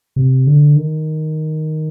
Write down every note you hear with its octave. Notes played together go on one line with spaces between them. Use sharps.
C3
D3
D#3